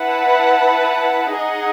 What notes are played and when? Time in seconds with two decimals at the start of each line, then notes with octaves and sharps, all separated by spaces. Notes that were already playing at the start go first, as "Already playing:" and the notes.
Already playing: E4 B4 F#5 A5
1.37 D#4 G#4 D#5 F#5